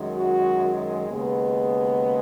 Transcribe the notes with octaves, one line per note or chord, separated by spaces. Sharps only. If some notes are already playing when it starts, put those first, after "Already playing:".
Already playing: F#2 D#3 G#3
F#4
D#2 C#3 G#3 B3